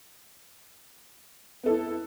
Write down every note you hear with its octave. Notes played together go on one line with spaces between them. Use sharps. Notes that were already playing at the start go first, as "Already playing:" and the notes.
B3 E4 A4